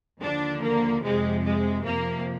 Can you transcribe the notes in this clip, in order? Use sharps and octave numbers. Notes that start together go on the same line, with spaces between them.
D#2 D3 F3 D4
A#3
F2 C3 F3 G#3
G#3
F2 C3 F3 A#3